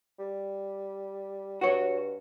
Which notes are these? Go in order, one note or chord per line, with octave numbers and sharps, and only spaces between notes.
G3
G2 F#4 C#5